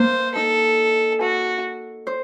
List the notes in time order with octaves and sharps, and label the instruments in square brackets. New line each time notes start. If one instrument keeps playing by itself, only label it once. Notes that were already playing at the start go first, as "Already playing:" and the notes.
Already playing: [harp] A#3 [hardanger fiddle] C5
[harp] D#4 [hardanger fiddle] A4
[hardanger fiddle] F#4 [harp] A4
[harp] C5